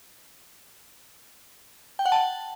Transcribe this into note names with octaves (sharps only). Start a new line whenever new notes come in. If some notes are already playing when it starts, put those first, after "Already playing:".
G5
F#5
A5